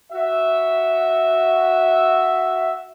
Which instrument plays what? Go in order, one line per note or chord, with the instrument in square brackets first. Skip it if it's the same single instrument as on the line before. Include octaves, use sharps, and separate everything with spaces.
[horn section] F#4 E5